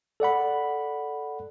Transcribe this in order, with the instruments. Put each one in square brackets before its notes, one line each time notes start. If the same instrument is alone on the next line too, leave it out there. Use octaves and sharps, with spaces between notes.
[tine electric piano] A4 D5 F#5 B5